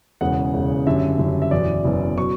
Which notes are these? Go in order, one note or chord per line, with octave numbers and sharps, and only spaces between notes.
E1 E2 C#3 F#5
E1 E2 C#3
F#1 F#2 D3 G3 E5
F#1 F#2 D3 G3
E5
F#1 E2 B2 D5
F#1 E2 B2
B2 F#3 C#6